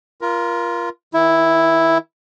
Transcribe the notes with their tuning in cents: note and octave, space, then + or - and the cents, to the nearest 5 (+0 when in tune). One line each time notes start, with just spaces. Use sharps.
F4 -15 A#4 +25
D#3 +35 E4 +0